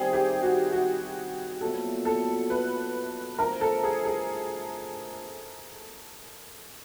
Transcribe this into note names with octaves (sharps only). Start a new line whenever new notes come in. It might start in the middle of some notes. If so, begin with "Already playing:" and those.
Already playing: D#3 G3 C4 E4 G#4
G4
F#4
F#4
A#2 F#3 B3 E4 A4
A4
B4
D3 F3 A3 A#4
A4
G#4
G#4